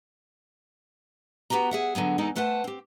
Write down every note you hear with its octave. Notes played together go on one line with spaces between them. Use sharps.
B3 F#4 G4 B4 A#5
G#4 E5 F#5
D3 F#3 B3 G#4
E2 G#3 B3 D#4 A4
E2 A3 B4 C5 F#5 A5
C4 G4